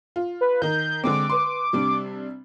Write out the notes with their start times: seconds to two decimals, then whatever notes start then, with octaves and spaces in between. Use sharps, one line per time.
0.16 F4
0.41 B4
0.62 D#3 D#4 G6
1.04 D3 G#3 C4 D6
1.30 B4 C6
1.73 C3 G3 D4